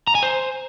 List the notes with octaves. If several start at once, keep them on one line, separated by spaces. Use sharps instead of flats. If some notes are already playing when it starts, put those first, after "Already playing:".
A#5
G#5
C5